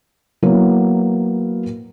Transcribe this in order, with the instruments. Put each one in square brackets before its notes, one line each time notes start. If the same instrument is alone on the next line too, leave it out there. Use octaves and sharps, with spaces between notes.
[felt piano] F#3 A#3 B3 E4